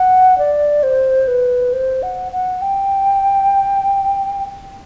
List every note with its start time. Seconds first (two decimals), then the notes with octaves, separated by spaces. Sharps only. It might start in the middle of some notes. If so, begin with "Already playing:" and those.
Already playing: F#5
0.38 D5
0.83 C5
1.28 B4
1.73 C5
2.03 F#5
2.32 F#5
2.62 G5